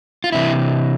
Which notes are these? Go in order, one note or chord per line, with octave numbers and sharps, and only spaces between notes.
F4
C3 E3 E4